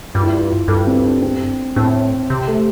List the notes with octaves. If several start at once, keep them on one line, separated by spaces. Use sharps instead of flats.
G2 F4
E4
F4
G2 A4
C4
D4
C4
A2 C4
C3
A3